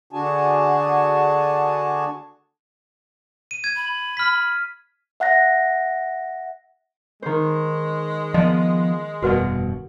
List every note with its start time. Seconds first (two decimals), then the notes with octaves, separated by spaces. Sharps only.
0.13 D3 D4 F#4 G#4 G#5 A5
3.51 D#7
3.64 G#6
3.76 B5
4.17 F6 B6
5.20 E5 F#5 F#6 A#6
7.22 D#3 G#3 C5
8.34 F3 B3 D#5
9.22 F1 G2 B2 F#4 B4 F#5